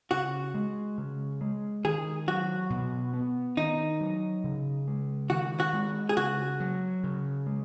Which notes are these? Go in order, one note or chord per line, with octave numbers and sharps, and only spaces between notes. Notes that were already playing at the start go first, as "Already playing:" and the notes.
C#3 F#4
G#3
C#3
G#3
D#3 G#4
F#3 F#4
B2
B3
D#3 D#4
F#3
C#3
G#3
D#3 F#4
F#4
G#3
G#4
C#3 F#4
F#3
C#3
G#3